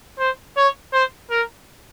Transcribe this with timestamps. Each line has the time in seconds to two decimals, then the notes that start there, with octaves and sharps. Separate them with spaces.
0.19 C5
0.57 C#5
0.93 C5
1.30 A#4